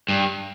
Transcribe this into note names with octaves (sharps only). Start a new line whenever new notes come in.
G2